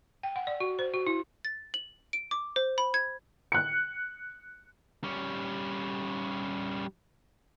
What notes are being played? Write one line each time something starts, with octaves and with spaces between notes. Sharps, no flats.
G5
F#5
D5
F#4
C5
F#4
E4
A6
F#7
D7
D6
C5
B5
G#6
F#6 C#7
G3 C#4